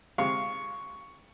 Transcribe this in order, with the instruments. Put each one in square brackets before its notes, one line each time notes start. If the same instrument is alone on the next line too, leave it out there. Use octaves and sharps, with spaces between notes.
[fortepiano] C3 G#3 F5 [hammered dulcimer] C#6